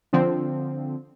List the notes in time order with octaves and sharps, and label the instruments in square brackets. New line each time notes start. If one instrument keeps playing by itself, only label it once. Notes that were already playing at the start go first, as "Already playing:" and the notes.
[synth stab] D3 F3 C4